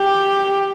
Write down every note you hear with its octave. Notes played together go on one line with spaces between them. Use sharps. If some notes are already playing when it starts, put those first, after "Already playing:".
Already playing: G4